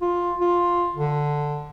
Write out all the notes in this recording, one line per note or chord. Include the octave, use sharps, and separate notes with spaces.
F4
F4
D3